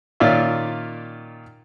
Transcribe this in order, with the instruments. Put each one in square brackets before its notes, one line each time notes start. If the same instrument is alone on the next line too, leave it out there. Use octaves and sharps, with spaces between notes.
[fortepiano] A#2 D#3 C#4 F4 D5 E5